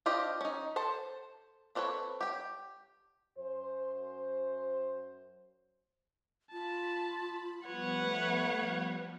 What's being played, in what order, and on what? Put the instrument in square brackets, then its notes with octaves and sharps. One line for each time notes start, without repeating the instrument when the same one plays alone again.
[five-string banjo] D4 F4 G4 C5 D#5
C#4 D#4
A4 C5 A5
C4 D4 A4 B4 C#5
G4 G5
[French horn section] F#2 C5
[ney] F4 [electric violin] A5 [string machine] B5
[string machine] F3 G3 B3 [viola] B4 F#5 [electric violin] C#5
[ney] A3